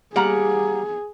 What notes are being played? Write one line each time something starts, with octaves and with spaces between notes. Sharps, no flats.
G3 A#3 G#4 F#5 A#5